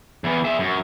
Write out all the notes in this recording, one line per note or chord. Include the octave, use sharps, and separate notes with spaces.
E2 E3
G#4 E5
F#2